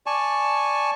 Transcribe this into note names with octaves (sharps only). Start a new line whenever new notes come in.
D5 G#5 A5 C#6